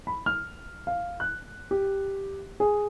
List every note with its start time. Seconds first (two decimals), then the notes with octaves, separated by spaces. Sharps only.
0.07 B5
0.26 F6
0.87 F5
1.20 F#6
1.71 G4
2.60 G#4